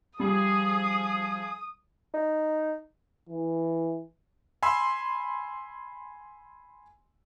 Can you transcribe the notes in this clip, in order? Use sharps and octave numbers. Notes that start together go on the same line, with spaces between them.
F3 G3 G#4 D#6
D#4
E3
G#5 B5 C6 E6